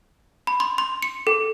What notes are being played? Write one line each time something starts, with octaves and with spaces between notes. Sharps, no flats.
B5
C6
C6
C#7
A4